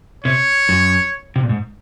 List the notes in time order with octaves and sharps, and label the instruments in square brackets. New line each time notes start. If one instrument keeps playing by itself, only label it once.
[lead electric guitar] C3 [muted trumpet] C#5
[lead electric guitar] F#2
C3
A#2
G#2